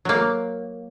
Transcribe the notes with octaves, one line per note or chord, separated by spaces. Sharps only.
F#3 A#3